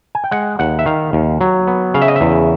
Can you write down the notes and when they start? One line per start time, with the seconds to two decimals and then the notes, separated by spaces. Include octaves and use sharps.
0.15 G#5
0.24 G5
0.31 G#3 F#5
0.59 D#2 F#5
0.79 E5
0.86 D#3 F5
1.13 D#2
1.41 F#3
1.67 B3
1.94 C#3 F5
2.02 E5
2.08 D#5
2.16 E5
2.21 E2